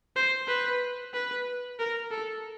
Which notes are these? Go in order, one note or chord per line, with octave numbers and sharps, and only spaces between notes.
C5
B4
B4
A#4
A4